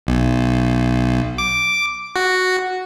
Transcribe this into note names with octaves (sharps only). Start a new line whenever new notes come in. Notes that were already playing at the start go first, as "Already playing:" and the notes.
B1
D6
F#4